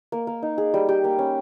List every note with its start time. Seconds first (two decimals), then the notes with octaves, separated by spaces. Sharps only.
0.12 A#3
0.27 A#3
0.43 D#4
0.58 G#4
0.74 G3
0.89 G4
1.04 A#3
1.19 C#4